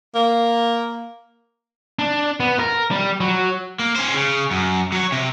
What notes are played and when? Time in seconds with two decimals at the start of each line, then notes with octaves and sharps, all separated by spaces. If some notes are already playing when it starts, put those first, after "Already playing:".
0.15 A#3
1.99 D4
2.40 B3
2.59 A#4
2.91 G3
3.21 F#3
3.79 A#3
3.96 C#4 C5
4.14 C#3
4.51 F#2
4.92 F#3 C#5
5.12 C3